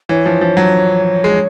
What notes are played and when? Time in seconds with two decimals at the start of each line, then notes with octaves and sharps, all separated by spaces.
0.09 E3 C#5
0.26 F3
0.41 F3
0.57 F#3
1.24 G#3